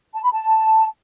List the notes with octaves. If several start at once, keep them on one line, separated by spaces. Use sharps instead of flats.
A5
B5
A5